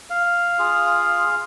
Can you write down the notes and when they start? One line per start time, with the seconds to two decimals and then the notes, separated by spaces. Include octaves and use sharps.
0.10 F5
0.59 F4 G#4